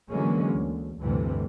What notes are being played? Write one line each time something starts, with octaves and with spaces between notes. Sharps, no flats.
D3 E3 F#3 G#3 A#3 C#4
D2
D2 G2 C3 E3